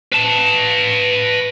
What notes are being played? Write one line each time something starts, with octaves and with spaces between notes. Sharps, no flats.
B4 A5